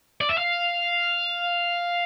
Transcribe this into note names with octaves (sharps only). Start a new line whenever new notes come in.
D5
E5
F5